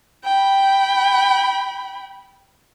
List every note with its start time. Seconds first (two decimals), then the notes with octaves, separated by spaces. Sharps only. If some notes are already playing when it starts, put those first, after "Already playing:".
0.24 G5 B5